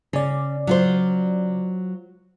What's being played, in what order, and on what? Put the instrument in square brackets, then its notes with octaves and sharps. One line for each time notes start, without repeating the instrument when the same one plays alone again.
[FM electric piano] C#3 D5 [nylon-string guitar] C#4
[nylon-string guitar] F#3 F4 C5